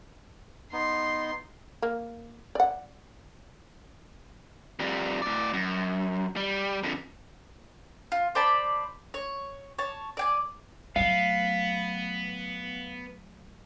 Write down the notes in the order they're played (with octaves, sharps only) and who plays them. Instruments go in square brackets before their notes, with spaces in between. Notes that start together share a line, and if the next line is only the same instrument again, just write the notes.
[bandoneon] B3 D#4 [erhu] C6
[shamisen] A#3
D5 F#5
[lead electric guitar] F2 G3
A2 D5
F#2
G3
F2 D3
[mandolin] F4
C5 D5 A5 B5
C#5
C#5 A5
D5 G5 G#5
[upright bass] F#3 A3 [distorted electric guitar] B3 [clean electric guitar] F5